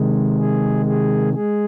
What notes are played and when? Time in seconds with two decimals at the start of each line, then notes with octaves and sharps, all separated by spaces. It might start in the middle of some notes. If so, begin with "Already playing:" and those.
Already playing: C3 D#3 G#3
0.38 G#4
0.86 G#4
1.34 G#3 G#4